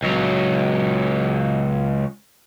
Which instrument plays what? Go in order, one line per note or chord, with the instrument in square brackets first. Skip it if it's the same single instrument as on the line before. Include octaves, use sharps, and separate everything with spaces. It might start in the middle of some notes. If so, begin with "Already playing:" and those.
[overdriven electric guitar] C#2 F#3